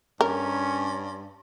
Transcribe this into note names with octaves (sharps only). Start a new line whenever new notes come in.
G2 C#4 A#4